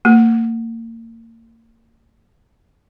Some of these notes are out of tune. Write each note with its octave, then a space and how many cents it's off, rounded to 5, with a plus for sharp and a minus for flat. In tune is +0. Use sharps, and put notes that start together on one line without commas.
A#3 -35